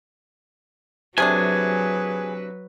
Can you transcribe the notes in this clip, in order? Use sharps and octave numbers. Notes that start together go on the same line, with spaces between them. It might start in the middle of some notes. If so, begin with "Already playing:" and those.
C3 F#3 A3 D4 G#4 B4 G#5